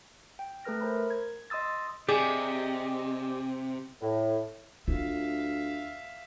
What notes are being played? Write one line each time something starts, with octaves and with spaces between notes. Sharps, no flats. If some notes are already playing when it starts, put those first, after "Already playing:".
G5
A3 A4 B4 F6 A#6
A#4 C5 A#5 B5
G#6
D#5 C6 D#6 E6 A6
C3 G4 G#4 D5 D#5
A2
D2 F4 E5 F5